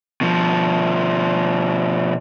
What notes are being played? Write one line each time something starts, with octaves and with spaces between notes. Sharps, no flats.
B2 F3